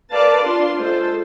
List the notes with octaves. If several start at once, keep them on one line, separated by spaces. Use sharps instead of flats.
A#4 B4 D5 F5 A5
D4 F4 C6
G#3 F4 A4 C5